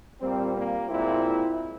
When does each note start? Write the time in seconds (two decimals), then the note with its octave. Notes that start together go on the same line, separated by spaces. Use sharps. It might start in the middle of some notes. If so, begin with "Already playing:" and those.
0.19 A#2 G3 A#3 C4
0.55 A#3
0.87 A#2 G#3 C4 E4